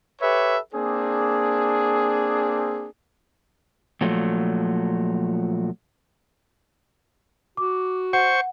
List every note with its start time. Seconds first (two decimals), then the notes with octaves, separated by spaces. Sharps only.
0.21 G4 A4 B4 C#5 E5
0.74 A#3 C4 D4 G#4
4.01 A#2 F3 F#3 A3
7.57 F#4 D6
8.13 C5 F#5 C#6